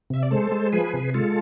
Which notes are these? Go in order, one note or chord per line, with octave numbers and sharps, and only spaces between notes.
C3 E5
D5
G#3 A4 C5
G#3
F3 G#4 B4
C3
G#3 F4 A4